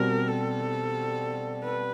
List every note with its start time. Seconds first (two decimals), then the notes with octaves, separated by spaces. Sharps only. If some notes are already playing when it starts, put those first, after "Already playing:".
Already playing: B2 G3 C4 A#4
0.28 A4
1.64 B4